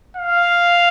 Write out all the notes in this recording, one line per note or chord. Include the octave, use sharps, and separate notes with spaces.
F5